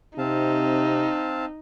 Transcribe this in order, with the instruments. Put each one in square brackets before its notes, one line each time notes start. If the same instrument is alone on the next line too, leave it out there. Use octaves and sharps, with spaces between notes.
[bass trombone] C3 [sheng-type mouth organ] C4 F5 A5 [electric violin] D#4